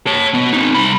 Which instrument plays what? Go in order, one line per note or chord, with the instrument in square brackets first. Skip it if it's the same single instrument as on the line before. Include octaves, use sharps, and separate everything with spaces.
[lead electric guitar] C#5 A5
B3 D#5
C4 D#4
C2 B5